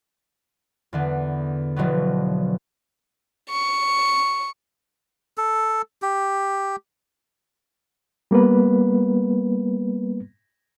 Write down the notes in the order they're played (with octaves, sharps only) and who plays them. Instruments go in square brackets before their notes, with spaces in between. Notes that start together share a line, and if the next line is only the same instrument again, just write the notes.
[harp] E2 D3 B3
E1 B2 F3 F#3 B3
[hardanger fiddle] C#6
[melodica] A4
G4
[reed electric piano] G3 A#3 B3 B4